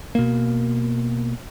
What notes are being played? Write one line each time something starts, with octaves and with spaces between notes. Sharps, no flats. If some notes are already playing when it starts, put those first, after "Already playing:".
B2 A#3